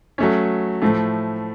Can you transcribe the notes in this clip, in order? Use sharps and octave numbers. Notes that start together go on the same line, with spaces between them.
F#3 A3 C#4
A2 F3 A3